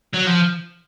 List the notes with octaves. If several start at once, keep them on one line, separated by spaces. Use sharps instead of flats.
F#3
F3